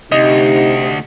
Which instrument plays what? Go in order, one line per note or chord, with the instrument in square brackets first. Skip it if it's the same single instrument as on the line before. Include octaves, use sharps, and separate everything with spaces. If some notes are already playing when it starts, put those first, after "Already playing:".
[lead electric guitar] D2 [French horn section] C3 G4 [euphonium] D#4 [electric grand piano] D#5